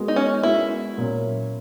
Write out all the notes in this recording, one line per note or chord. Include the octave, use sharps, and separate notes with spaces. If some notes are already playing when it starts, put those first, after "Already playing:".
Already playing: G#3 B3 F#4 A#4
D#4
C#4
G#3 B3 E4 F#4 A#4
A#2 F#3 C#4